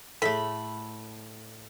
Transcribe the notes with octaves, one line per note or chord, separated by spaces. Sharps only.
A2 A3 G#4 A4 B5